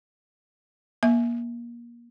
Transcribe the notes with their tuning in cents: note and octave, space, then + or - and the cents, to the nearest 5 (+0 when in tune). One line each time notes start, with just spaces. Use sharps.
A#3 +25 E5 +0